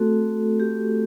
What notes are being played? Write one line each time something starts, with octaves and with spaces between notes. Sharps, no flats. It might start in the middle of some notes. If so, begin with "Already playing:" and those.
Already playing: A3 C4 F#4 A4
G4